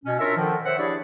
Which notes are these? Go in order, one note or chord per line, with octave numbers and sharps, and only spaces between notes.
B2 C#4
D4 F4 A#4 C#5 E5
D3 D#3 F3
C5 C#5 E5 F#5
D4 E4 G4 G#4 C#5 D5